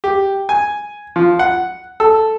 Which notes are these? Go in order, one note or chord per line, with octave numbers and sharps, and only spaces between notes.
G4
G#5
F3
F#5
A4